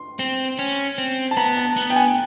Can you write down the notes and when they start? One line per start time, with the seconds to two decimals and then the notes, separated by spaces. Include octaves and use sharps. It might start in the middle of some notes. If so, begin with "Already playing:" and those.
Already playing: C6
0.19 C4
0.59 C#4
0.98 C4
1.31 A5
1.37 B3 A#5
1.57 A5
1.76 B3
1.90 G5
1.96 G#5